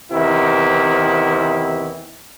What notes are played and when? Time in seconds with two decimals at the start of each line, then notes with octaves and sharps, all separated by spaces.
0.11 E2 C3 D#3 E4